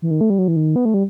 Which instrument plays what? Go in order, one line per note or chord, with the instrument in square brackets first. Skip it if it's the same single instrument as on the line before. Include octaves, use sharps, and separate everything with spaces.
[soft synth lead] E3
D#3
A3
G3
F#3
E3
D#3
B3
A3
G3